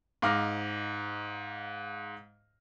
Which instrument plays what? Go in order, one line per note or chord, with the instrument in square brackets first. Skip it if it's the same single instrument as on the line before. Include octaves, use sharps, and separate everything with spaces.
[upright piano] G#2 F5 D6 F6 A#6